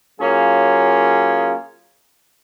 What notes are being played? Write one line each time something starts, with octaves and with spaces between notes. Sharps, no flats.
F#3 A#3 C#4 F4 G#4